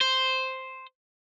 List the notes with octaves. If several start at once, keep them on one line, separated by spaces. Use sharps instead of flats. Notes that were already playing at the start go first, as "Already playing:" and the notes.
C5